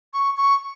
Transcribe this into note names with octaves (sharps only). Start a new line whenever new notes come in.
C#6
C#6